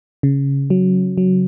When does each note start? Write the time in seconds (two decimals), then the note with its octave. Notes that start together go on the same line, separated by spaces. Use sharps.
0.23 C#3
0.70 F#3
1.18 F#3